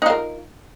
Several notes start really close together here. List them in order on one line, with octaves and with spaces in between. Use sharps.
D#4 F4 A#4